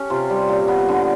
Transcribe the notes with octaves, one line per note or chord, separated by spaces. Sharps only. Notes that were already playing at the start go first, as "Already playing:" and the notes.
Already playing: C#4 G4 A4
C3 F4
G3
A#2
B3
D3